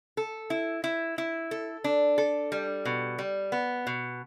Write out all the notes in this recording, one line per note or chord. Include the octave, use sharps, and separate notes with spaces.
A4
E4
E4
E4
A4
D4
A4
G3
B2
G3
B3
B2